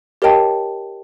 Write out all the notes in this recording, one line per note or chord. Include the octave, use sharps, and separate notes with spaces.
G4 A#4 C#5 D#5 G5 A5